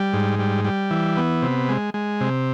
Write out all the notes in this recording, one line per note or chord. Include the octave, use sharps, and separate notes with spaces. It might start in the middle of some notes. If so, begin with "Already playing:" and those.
Already playing: G3
G#2
G3
G3
E3
B3
C3
G#3
G#3
C3